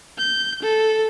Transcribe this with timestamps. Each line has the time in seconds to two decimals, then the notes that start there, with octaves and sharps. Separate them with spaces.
0.18 G6
0.63 A4